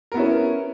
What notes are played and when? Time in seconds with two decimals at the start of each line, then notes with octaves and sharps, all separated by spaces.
0.12 A#4
0.14 B3
0.17 E4
0.20 C#4